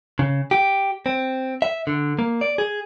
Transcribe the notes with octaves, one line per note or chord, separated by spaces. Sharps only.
C#3
G4
C4
E5
D3
A#3
D5
G#4